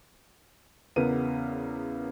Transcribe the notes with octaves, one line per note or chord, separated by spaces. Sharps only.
E2 C#3 B3 A#4 D#7